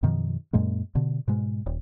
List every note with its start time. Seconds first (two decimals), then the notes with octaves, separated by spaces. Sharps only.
0.03 F#2 B2 D#3 F3
0.53 F#2 A#2 G#3 A#3
0.95 B2 D3
1.28 G#2 B2 G#3
1.66 D#1